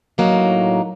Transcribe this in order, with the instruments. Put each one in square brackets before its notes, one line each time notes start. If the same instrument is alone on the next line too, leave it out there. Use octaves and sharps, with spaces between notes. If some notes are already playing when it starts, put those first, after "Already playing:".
[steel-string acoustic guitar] A2 F#3 A#3 D#4